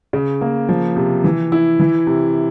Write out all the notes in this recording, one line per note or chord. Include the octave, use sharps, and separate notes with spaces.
C#3
A#3
F3
C3
E3
E4
E3
C3